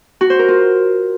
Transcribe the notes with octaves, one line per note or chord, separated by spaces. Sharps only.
F#4
C5
A#4
F4